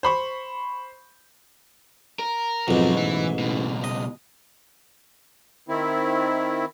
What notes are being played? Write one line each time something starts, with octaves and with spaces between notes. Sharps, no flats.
C5 B5 C#6
A#4
B1 F2 G#2 F#3 D#4
A1 E3
C#2 B2
D#5
D#3 C4 E4